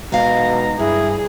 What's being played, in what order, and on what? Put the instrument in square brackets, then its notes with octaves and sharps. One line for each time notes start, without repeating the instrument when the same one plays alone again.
[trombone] B2 [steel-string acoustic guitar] G#3 D#4 F5 [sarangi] A#5
[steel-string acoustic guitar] G2 [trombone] E4 [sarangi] G#4